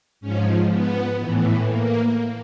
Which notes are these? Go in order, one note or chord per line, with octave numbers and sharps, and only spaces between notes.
G#2 F3 C#4
B3
A2 E3
A#3